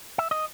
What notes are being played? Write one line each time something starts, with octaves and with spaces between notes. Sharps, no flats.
E5
D#5